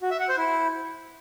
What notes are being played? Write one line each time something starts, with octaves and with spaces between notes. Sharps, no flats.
F#4
E5
F#5
C5
E4